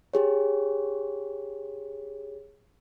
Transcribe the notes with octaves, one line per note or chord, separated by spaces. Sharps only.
G4 G#4 C#5